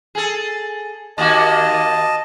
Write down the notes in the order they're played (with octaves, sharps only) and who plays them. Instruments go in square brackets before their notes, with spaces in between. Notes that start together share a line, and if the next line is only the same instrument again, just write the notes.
[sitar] G#4 A4
[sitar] D#2 A#3 F#4 [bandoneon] D#5 A5